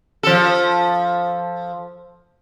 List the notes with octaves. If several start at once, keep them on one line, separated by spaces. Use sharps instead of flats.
F3 A4